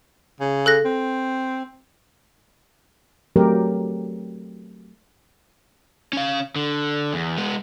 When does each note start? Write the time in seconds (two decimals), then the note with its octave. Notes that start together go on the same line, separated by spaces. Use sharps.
0.40 C#3
0.66 A4 F#6 A#6
0.85 C4
3.36 F#3 A3 C4 G4 A#4
6.13 C#4 F5
6.56 D3
7.13 E2
7.38 G#3 B3